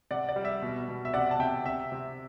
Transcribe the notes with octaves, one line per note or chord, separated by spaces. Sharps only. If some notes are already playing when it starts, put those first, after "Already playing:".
C3 D5 F#5
D5
G3
E5
B2
B2
E5
C3 D5 F#5
A5
C3 E5 G5
C3 E5
C3